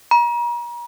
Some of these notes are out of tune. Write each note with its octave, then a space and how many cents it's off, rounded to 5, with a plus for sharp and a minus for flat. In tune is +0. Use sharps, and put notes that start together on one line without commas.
A#5 +40